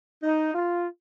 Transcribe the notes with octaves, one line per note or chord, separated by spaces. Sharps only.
D#4
F4